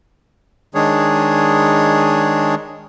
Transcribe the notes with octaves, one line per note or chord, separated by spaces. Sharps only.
D#3 G#3 D4 G#4 C#5